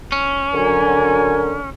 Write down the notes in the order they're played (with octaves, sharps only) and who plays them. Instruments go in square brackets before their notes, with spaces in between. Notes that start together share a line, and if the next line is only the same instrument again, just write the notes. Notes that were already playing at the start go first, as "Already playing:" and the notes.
[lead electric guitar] C#4
[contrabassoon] D3 [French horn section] F#3 A#4 [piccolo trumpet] G#5